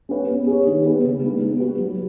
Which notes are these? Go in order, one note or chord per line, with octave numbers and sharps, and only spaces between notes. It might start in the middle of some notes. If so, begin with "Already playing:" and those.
C#4 B4
B3
G#4 C#5
D#3
B3 G#4 B4
C#3
G#3 D#4 B4
B3
F#4 B4
F#3